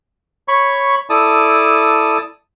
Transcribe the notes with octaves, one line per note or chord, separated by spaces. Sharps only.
C#5 B5 C#6
E4 A4 D5 A5 D#6